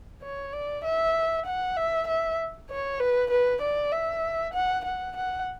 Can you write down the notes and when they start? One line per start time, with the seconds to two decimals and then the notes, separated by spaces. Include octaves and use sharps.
0.22 C#5
0.53 D5
0.84 E5
1.46 F#5
1.77 E5
2.07 E5
2.70 C#5
3.00 B4
3.30 B4
3.62 D5
3.92 E5
4.54 F#5
4.85 F#5
5.16 F#5